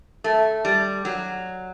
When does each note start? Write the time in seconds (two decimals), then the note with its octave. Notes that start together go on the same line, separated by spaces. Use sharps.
0.24 A3
0.65 G3
1.05 F#3